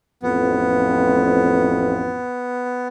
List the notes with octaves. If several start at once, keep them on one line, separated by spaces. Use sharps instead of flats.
A1 F2 B3